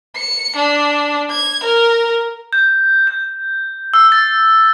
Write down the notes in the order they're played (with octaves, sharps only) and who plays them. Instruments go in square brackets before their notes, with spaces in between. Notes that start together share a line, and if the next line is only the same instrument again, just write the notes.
[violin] C#7
D4
G#6
A#4
[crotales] G6
G6
E6
A6